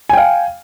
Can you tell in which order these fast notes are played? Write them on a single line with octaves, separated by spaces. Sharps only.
G#5 G5 F5